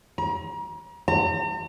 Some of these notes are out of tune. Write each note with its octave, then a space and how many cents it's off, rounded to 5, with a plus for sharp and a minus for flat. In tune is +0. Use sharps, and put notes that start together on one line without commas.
A#5 +35
A#5 -45